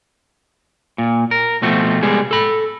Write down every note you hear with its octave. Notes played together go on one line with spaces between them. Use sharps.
A#2
A#4
B2 F3 A3 C4
C2 G3 G#3 B3 G#4
A4 B5